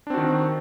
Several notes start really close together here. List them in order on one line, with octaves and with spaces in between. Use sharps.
D4 C4 F#4 D#3